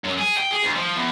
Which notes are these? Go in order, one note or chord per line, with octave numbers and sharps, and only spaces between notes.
F#2
G#4
G5
G#4
D2
F3
E2